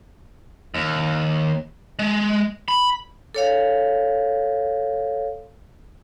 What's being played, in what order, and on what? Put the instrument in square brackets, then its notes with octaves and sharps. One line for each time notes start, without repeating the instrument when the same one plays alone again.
[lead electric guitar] D#2
G#3
B5
[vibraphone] A4 C#5 F5